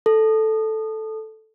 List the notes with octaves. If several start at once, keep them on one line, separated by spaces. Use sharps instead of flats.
A4